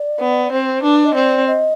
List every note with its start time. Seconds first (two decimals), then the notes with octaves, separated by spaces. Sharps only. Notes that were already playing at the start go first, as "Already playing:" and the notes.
Already playing: D5
0.21 B3
0.52 C4 C5
0.83 D4 B4
1.05 D#5
1.15 C4 D5
1.47 D#5